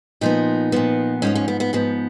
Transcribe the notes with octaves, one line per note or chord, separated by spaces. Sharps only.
A#2 F3 B3 D#4
A#2 F3 B3
G#2 F3 B3 C#4
C#4
B3
B3
G#2 F3 B3